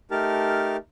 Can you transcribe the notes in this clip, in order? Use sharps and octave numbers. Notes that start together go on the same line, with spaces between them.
A3 D#4 G4 A#4 A5 F6